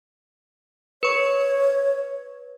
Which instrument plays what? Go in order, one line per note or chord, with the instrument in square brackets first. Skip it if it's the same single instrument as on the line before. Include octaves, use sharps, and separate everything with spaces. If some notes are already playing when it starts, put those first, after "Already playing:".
[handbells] B4 C#6 [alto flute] C#5